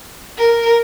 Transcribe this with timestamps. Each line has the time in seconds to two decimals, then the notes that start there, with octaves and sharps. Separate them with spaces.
0.38 A#4